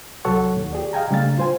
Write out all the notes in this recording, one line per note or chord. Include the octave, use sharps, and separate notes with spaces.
C2 F#3 A4 C#5 F#5 C#6
D#2
G4 G#4 D5
D#5 F5 G5 G#5 A#5
C#3 G3 A3 D4 F5 A6
F4 C5 G#5